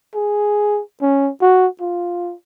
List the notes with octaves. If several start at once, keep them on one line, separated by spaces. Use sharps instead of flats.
G#4
C#4
F#4
F4